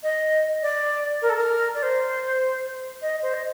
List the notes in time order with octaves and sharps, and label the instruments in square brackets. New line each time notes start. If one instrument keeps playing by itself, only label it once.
[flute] D#5
D5
A#4
A4
A#4
D5
C5
D#5
C5
D#5